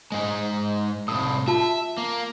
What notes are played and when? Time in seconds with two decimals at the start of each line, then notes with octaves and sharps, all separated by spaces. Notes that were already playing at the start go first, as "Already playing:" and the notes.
0.12 G#2 G#3
1.08 C2 A2 D#6
1.48 F4 E5 A5
1.98 A#3